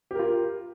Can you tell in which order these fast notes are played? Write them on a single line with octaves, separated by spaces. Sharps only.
G4 A#4 F4